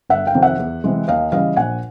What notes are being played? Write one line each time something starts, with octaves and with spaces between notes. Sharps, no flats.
G1 E5 F#5
F5 G5
F2 C3 D#3
E5 F#5
E2
C3 E3 G#3
D#2 D#5 F5
C#3 E3 G3 D#5 F5
A#1 F#5 G#5